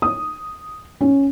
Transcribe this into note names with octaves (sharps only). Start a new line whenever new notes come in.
D#6
C#4